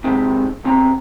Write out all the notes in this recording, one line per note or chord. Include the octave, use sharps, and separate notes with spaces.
C3 D#3 G#3 C4
B1 C4 A#5